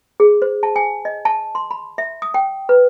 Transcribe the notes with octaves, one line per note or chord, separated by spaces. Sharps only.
G#4
C5
A5
G#5
D#5
A5
C6
B5
E5
D#6
G5
B4